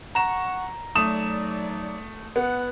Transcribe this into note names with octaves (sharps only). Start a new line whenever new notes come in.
F#5 A#5 C#6 E7
F#3 A3 D#4 D5 D#6 E7
B3 F#5